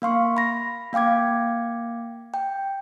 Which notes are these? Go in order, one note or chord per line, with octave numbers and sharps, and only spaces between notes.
A#3 F5 C6 C#6
B5 A#6
A#3 F5 G5 D6 G#6
G5